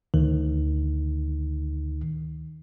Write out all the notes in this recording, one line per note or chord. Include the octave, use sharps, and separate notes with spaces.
D2 D#3